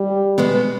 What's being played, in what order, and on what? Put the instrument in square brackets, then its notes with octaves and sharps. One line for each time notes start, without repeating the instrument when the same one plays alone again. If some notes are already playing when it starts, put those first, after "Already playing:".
Already playing: [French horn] G3
[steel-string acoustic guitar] B2 G#3 B3